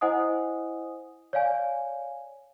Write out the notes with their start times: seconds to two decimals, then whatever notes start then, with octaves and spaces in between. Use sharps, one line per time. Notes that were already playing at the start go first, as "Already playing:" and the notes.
0.01 E4 C5 D#5 F#5 G#5 D#6
1.33 C#5 D5 F5 G#5